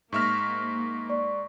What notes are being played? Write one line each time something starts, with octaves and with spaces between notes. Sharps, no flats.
G#2 A#3 E5 C#6 F6 A#6
D5 C#6